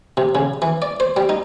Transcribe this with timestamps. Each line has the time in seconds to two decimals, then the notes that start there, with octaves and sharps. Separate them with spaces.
0.17 C3
0.35 C#3
0.62 E3
0.82 D5
1.00 C5
1.17 G3
1.29 D#4